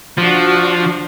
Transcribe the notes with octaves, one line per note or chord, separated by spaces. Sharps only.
F3 D4 F#4